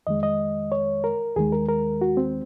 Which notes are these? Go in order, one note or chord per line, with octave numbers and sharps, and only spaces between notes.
F2 D#3 G#3 D#5
D#5
C#5
A#4
D#2 D#3 G#3 G#4
A#4
A#4
F#4
C4